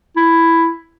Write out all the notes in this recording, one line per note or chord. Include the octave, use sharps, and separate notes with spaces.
E4